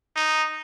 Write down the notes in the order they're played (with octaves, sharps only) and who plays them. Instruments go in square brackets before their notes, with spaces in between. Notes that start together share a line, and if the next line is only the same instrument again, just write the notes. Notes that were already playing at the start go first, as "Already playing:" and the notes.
[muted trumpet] D#4